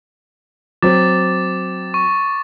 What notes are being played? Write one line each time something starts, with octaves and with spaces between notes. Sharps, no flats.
F#3 C4 D6 A6
C#6